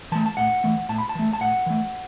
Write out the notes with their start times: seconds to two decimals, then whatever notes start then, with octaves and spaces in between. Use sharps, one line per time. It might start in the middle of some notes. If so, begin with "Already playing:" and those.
0.12 E3 A3 A5
0.26 A5
0.37 A2 F#5
0.64 E3 A3
0.89 A2 A5
0.98 B5
1.09 A5
1.15 E3 A3
1.33 A5
1.41 A2 F#5
1.66 E3 A3